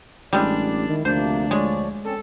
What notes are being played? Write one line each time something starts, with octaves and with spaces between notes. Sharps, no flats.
A1 G3 G#3 D4 D5
D#3 E4
D2 C3 F3 A#3 D4 C5
F3 G#3 C#5 D5
C4 C#4 A4